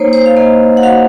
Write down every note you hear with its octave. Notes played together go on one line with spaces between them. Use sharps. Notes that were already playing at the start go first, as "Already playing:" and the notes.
Already playing: A#3 D#4 C5 C#5
C5
F5
A#3 D#5
F#5
F#4 F5